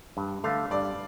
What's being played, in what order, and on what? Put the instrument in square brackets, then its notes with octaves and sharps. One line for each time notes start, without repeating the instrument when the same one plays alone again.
[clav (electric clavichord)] G2
[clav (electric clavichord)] D3 A3 [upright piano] F5
[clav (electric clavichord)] G2 [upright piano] D5